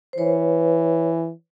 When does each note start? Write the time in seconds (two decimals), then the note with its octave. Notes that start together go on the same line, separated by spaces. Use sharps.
0.13 C5
0.18 E3 B4 C#5